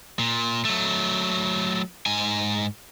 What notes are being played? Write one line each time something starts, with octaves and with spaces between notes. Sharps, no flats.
A#2
F#3 A3
G#2 G#5